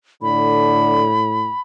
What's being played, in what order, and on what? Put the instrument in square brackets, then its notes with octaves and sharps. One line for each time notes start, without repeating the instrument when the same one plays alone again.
[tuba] A2 [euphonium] D3 [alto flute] B5